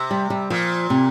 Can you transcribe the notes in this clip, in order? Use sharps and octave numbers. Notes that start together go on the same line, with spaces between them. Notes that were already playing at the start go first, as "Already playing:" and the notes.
Already playing: C3
G3
G3
A#2 F3
C3